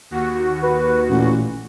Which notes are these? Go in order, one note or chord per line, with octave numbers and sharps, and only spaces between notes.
D#2 F#4
B4
A1 A#2